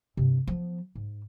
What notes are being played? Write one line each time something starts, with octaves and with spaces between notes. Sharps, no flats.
G2 C3
F3 B3
G#2